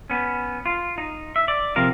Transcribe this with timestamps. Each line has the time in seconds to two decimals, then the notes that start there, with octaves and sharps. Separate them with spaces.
0.10 B3 C#4
0.66 F4
0.98 D#4
1.36 E5
1.48 D5
1.76 C3 F3 A#4 F5